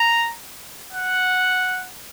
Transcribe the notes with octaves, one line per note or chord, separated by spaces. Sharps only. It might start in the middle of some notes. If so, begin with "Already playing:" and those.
Already playing: A#5
F#5